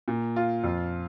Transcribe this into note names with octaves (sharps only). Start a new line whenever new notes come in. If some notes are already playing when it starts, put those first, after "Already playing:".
A#2
F4
F2